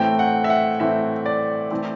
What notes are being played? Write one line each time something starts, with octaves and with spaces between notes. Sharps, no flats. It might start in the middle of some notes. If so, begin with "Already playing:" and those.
Already playing: A2 E3 A3 C4 G5
F#5
E5
F#5
A2 E3 A3 C4 E5
D5
E3 A3 C4